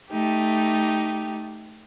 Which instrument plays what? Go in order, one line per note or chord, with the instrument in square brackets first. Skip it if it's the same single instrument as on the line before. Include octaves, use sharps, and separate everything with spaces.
[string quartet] A3 D#4 G4